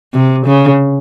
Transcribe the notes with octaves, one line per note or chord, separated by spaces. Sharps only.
C3
C#3